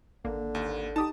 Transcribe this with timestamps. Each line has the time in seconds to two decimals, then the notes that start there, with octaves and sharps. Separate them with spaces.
0.25 G#1 D3 A#3
0.55 D#2
0.96 D#4 G4 A5 D#6